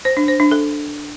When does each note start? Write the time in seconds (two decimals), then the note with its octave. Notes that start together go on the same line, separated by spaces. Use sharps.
0.05 C5
0.17 D4
0.28 C5
0.40 D4
0.51 A4